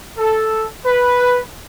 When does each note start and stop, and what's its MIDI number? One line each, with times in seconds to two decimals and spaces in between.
0.17 0.65 69
0.85 1.38 71